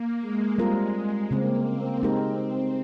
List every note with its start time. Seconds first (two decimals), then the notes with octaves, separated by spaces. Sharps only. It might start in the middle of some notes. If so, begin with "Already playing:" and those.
Already playing: A#3
0.21 G#3
0.58 G3 G#3 C4 F4 A#4
1.30 C#3 G#3 A#3 C4
1.66 C4
2.02 G#3 C4 D#4 G4 A#4